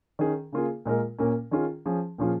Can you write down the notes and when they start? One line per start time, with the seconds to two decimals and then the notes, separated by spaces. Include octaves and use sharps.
0.19 D#3 C#4 G#4
0.52 C#3 A#3 F4 G#4
0.86 A#2 G#3 F4 A#4
1.18 A#2 A#3 C#4 A#4
1.51 D#3 C#4 F4 G#4
1.85 F3 C#4 G#4
2.18 A#2 F3 C#4 F4 G#4